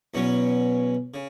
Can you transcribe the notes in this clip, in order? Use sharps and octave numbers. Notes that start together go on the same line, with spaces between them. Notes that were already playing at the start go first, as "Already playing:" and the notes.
E2 B2 F#3 C#4
C#3